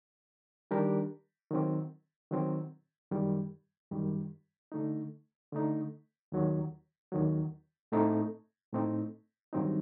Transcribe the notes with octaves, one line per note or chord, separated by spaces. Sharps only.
D#3 G3 D4 G4 A#4
D#3 F#3 C4
D#3 F#3 C4
F#2 D#3 G3
F#2 D#3 G3
D3 A3 D#4
D3 A3 D#4
D#2 D#3 F#3
D#2 D#3 F#3
A2 A3 C4 D#4
A2 A3 C4 D#4
G2 D#3 F#3 C4 D#4